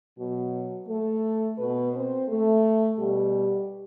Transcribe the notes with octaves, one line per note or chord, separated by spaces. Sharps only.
B2 F#3 F#4
A3 A4
B2 B3 B4
C4 C5
A3 A4
B2 G3 G4